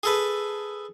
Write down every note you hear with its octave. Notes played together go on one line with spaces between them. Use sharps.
G#4 A4 B4